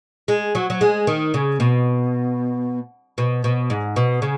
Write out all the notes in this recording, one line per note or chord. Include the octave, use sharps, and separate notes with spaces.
G#3
F#3
F#3
G#3
D#3
C#3
B2
B2
B2
G#2
B2
C#3